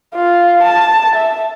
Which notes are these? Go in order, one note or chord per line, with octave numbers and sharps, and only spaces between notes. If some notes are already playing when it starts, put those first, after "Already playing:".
F4
A5
E5